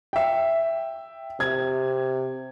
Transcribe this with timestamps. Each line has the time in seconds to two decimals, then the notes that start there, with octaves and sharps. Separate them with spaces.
0.13 E5 G5
1.40 C3 G#6